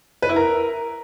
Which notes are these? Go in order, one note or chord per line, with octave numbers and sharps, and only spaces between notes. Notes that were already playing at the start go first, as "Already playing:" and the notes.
B4
E4
A#4